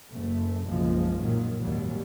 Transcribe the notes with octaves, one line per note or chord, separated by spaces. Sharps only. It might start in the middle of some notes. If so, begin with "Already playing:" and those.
F#1 A3
F#1 B1 F3 G#3
A#2 D#3 F#3
G#1 D#2 F#3 G3